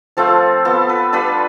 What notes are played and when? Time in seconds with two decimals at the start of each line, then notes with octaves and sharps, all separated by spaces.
0.17 F3 A3 C4 F4 A4
0.65 B3 F4 A4
0.89 B4
1.13 G3 D4 F4 B4